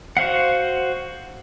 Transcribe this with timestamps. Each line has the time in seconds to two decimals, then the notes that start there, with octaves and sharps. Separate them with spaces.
0.17 F#4 C5 F5 F#5